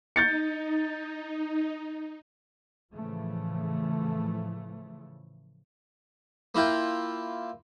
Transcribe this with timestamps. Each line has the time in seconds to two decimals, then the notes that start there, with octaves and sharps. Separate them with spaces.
0.16 D#4 G6 A6 C#7
2.93 A2 C#3 E3 F3 A3
6.55 A#3 E4 F4 G5